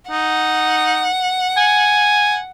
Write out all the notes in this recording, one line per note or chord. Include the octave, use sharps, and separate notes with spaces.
D#4 F#5
G#5